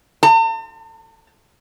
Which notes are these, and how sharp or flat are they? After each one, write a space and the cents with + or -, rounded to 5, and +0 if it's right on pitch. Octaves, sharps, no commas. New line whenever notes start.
A5 +45